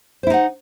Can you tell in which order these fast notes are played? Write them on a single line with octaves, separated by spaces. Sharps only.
C5 E4 D#4 F#5